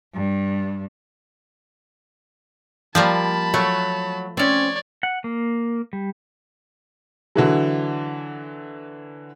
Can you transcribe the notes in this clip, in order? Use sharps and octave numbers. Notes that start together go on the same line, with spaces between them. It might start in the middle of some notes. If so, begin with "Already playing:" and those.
G2
F3 G3 A#3 A5 B5
F#3 A3
C4 C#4 C#5 D5
F#5
A#3
G3
D3 E3 F#3